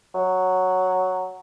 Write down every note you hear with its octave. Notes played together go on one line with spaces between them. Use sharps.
F#3